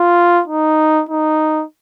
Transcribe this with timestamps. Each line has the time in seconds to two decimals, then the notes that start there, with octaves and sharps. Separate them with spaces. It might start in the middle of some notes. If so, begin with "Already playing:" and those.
Already playing: F4
0.48 D#4
1.09 D#4